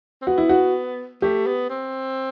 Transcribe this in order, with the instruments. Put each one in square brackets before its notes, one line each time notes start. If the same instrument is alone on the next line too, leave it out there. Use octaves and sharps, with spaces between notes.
[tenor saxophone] C4
[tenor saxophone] B3 [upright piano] F#4
[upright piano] E4
F#4
[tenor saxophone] A3 [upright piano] G4
[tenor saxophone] B3
C4